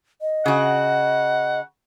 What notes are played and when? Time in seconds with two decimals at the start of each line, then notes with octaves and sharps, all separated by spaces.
0.21 D#5
0.46 C#3 F#4 F#5